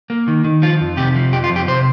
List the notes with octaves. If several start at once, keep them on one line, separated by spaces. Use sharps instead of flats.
A#3
D#3
D#3
F3 F4
F2
C3 G4
F3
F2 G4
F4
F2
G4
C3 C5